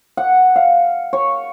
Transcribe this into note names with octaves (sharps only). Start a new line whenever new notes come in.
F#5
F5
C#5